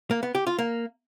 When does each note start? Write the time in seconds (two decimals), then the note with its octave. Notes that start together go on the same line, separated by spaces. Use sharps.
0.11 A#3
0.23 B3
0.35 G4
0.47 F4
0.59 A#3